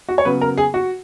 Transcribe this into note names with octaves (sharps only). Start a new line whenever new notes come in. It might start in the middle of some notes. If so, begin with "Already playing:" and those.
F#4
C#5
C#3 F#3 B3 B4
A#4
G#4
F#4